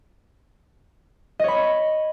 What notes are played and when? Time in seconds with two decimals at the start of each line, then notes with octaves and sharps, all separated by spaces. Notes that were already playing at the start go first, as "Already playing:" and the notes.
1.39 D#5
1.44 C#5
1.48 B5